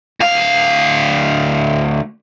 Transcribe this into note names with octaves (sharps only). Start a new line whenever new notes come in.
D2 F5